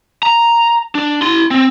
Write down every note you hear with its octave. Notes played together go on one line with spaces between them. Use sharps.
A#5
D4
E4 C6
C4